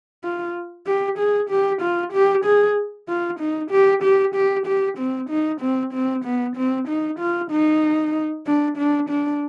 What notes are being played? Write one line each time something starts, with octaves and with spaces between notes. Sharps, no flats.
F4
G4
G#4
G4
F4
G4
G#4
F4
D#4
G4
G4
G4
G4
C4
D#4
C4
C4
B3
C4
D#4
F4
D#4
D4
D4
D4